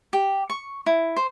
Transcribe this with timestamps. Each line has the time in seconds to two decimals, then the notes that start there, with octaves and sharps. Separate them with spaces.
0.13 G4
0.50 C#6
0.86 E4
1.17 C5